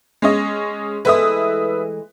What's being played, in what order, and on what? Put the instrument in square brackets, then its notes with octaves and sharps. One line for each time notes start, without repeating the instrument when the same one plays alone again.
[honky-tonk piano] G#3 C#4 D#5
[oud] E3 G#3 A3 [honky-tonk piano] B4 E5 D#6